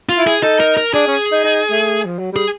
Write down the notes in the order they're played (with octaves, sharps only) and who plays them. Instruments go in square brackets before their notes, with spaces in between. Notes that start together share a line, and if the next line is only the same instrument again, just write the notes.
[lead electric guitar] F4
[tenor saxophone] E4
[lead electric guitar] G#4
[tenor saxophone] D#4 [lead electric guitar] A4
[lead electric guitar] A#4
A#4
[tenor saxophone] D4 [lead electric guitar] G#4
[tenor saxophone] C#4
D#4
D#4
A3
F3
F#3
[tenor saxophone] G3 [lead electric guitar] G#4